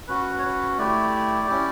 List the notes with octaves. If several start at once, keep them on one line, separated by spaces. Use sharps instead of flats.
C#4 F#4 B4
C#5
B4
A3 E4 G4 D5
C#4 E4 G4